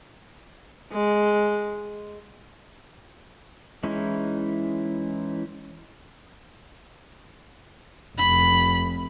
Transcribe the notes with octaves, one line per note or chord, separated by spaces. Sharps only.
G#3
E3 G#3 C#4 D#4 E4
F1 B5